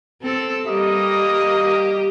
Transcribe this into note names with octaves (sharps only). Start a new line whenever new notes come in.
C4 A4
G3 A#3 G4 D#5 D#6
G4